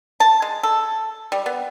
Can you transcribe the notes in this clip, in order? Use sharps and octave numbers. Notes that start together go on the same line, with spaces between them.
A5
G#3
A4
G3
B3